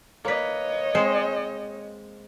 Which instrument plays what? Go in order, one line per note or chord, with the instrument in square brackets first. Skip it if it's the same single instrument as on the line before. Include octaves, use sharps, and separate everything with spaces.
[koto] A#3 B4 [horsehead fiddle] C#5 D#5
[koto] G#3 C4 C5